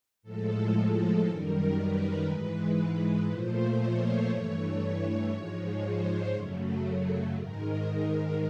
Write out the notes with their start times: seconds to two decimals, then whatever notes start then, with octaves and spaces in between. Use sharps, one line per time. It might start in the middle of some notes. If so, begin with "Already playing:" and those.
0.23 A2 F3 G#3 A4
1.24 F#2 D#3 G3 A#4
1.75 B4
2.26 G#2 E3 G#3
3.27 A#2 F3 A3 C5
3.78 C#5
4.28 G2 E3 A3 C#5
5.30 G#2 F3 G#3 C#5
5.81 C5
6.32 F#2 C#3 F#3 A3
7.33 G#2 D#3 G#3 A#4